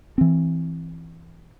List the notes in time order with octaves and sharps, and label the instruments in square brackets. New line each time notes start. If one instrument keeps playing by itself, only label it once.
[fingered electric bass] E3 C4